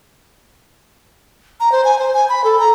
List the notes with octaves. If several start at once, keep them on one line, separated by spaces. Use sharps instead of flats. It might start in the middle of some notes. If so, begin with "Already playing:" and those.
A#5
C5
G#5
C5
G#5
B5
A4
A#5